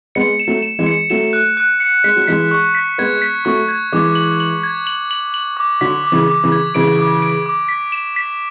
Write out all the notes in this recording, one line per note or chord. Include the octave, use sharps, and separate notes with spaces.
G#3 B3 C#7
E7
F#3 A3
E7
E3 G#3
C#7
F#3 A3 E7
F#6
F#6
C#7
G#3 B6
F#3
E3 G#3 B6
C#6
B6
G#3 B3 G#6
B6
F#3 A3 C#6
G#6
E3 G#3 D6
F#7
F#7
G#6
F#7
F#7
F#7
D6
D3 F#3 B6
D6
C#3 E3
D6
C#3 E3
G#6
C#3 E3 D7
D6
D7
D6
B6
E7
B6